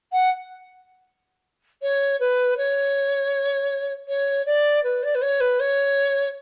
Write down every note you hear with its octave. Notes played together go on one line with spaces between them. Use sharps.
F#5
C#5
B4
C#5
C#5
D5
B4
D5
B4
C#5
B4
C#5